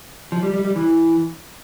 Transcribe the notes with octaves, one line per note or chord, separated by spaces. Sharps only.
F3
G3
G3
G3
E3